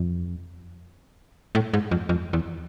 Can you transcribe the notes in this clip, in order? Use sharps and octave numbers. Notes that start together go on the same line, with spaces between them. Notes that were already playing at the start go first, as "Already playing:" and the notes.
Already playing: F2
A2
G#2
F2
F2
E2